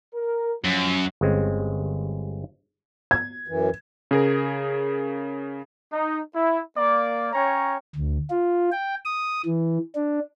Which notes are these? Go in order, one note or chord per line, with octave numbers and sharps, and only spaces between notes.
A#4
F#2 F3
G1 G#3 C4 C#4
G#6
F#2 E3
C#3 G#4 A#4
D#4
E4
A#3 D5
C#4 C#5 G5 A#5
D2
F4
G5
D#6
E3
D4